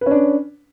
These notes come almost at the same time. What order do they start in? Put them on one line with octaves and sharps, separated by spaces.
B4 C#4 D4